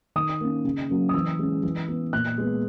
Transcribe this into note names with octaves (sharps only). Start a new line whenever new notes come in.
D#3 D#6
A#3 C#4
C#3
F#3 A#3 C#4
D#6
E3 E6
G#3 C#4
E3
B3
A#2 F#6
G#3 B3